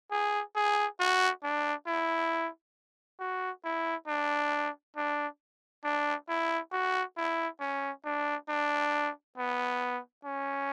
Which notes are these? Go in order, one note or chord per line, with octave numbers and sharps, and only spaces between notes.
G#4
G#4
F#4
D4
E4
F#4
E4
D4
D4
D4
E4
F#4
E4
C#4
D4
D4
B3
C#4